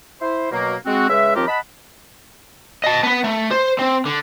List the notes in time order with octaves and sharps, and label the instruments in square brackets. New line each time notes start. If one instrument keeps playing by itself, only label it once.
[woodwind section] E4 C5
B2 F#3 A#3
G#3 C4 F#4
C#3 G#3 B4 E5
D#2 F3 C4 F4 G4 A#4
D#5 F#5 A5 B5
[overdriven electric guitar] D#5 A5
B3 B4
A3
C5
C4
D3